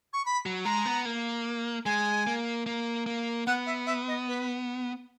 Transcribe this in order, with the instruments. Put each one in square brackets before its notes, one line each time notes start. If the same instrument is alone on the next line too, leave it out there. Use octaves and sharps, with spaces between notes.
[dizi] C#6
B5
[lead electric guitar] F#3
[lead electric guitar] G#3 [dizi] A#5
[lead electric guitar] B3
A#3
[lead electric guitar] G#3 [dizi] G#5
[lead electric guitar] A#3
A#3
A#3
[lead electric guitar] B3 [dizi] F#5
[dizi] E5
E5
D#5
B4